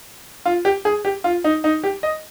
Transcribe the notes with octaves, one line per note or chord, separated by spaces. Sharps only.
F4
G4
G#4
G4
F4
D#4
D#4
G4
D#5